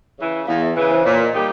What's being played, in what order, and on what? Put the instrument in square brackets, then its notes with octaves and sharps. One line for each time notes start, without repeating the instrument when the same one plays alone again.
[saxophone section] C#3 E3
[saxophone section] E2 [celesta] F5
[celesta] E5
[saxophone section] C#3 E3 [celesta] B4
[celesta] C5
[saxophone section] A#2 [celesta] C#5
[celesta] D#5
[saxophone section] G3 A#3 D#4 G4